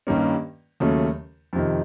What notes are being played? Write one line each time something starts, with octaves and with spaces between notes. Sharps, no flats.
G2 D#3 G3 A#3 C#4
D#2 C#3 F#3 A3 C#4
F2 C3 D#3